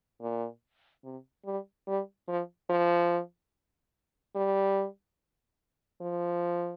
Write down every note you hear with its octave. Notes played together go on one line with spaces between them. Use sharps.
A#2
C3
G3
G3
F3
F3
G3
F3